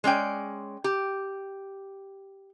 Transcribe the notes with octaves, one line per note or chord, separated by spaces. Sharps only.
G#3 C#4 D5 G5
G4